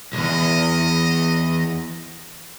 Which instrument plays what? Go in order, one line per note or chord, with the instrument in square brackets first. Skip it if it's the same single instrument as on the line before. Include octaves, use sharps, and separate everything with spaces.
[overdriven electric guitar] B1 E2 [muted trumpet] D#5